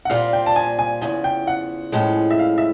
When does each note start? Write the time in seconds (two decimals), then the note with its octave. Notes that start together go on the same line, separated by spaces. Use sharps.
0.05 F#5
0.10 A#2 G3 C4 F4 F5
0.33 G5
0.46 A5
0.56 G#5
0.79 G#5
1.01 E2 C#3 F3 G#5
1.24 G5
1.47 F#5
1.92 A2 F3 G#3 C#4
2.30 E5
2.39 F5
2.58 E5